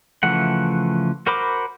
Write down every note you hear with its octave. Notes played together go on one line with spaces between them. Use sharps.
C#3 E3 F3 A3 F#5
F#4 A#4 C5 B5 D6